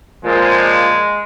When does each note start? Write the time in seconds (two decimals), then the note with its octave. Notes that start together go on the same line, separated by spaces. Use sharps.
0.24 A#2 F3 G#3